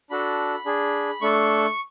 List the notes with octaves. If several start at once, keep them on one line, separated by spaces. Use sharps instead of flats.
D4 F#4 A4 B5
D4 G#4
A3 D4 A4 C#6